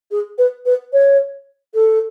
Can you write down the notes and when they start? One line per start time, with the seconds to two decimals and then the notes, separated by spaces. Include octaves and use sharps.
0.11 G#4
0.38 B4
0.65 B4
0.93 C#5
1.74 A4